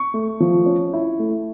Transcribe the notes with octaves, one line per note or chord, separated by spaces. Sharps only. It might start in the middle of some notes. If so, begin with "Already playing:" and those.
Already playing: C#6
A3
F3
C#4
E4
A3